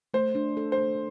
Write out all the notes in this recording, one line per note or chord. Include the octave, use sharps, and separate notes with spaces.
A3 C5
D4
A4
C5
A3